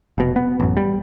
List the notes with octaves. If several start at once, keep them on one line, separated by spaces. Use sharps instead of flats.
F1 B2
B3
A1 F#2
G3